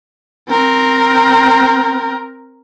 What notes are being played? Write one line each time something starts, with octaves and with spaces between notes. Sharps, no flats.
C4 A#4